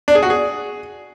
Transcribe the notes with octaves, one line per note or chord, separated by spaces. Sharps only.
D4
G#4
F#4
G#4